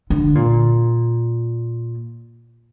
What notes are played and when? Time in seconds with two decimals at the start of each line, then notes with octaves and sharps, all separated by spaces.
0.10 D3
0.35 A#2